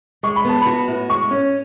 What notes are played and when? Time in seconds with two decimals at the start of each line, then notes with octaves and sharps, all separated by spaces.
0.23 G#3 C#6
0.36 B5
0.45 B3 A5
0.61 F#4 B5
0.88 A2
1.09 G#3 C#6
1.31 C#4